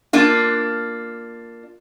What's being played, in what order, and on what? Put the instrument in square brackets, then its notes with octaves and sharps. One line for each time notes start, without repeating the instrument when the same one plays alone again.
[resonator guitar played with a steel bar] A#3 D4 F4